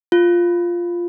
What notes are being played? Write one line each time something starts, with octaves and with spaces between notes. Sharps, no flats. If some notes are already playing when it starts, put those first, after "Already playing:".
F4